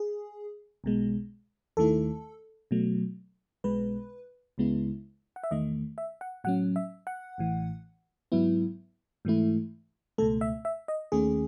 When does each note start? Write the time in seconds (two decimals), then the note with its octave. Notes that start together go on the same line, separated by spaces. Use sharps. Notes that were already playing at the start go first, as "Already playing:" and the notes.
Already playing: G#4
0.84 B1 B2 G#3
1.77 D#2 D#3 A3 E4 A4
2.71 B2 F#3 A3
3.64 B1 B2 G#3 B4
4.58 C#2 C#3 G#3 B3 E4
5.36 F#5
5.43 E5
5.51 E2 D#3 A3 D#5
5.98 E5
6.21 F#5
6.44 A2 F#3 C#4 F#5
6.76 E5
7.07 F#5
7.38 A1 A2 E3
8.32 G#2 F#3 B3 E4
9.25 G#2 E3 A3 E4
10.18 C#2 B2 A3 A4
10.41 E5
10.65 E5
10.88 D#5
11.12 D#2 D#3 A3 C#4 G#4